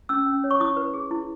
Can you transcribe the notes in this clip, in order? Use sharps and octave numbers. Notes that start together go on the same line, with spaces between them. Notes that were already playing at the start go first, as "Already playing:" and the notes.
C#4 E6
C#4
C#5
C#6
E4 D#6
B4
G#4
E4